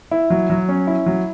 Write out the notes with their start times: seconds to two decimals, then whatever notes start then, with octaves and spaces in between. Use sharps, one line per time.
0.11 E4
0.30 F#3
0.50 F#3
0.69 C#4
0.87 E4
1.06 F#3